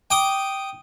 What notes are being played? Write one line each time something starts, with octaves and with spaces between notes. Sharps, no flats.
G5 D6 D#6